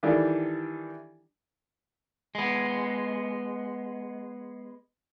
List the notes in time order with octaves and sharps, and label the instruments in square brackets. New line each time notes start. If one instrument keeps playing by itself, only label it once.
[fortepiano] D#3 E3 G3 D4 G4 A4
[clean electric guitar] G#3 B3